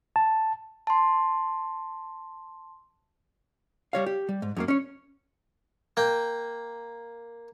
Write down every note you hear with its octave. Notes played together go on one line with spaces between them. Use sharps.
A5
A5 C6
G3 C#5 F5
G4
G3
G#2
F#2 F#3 A#3
C#4 C#5
A#3 G5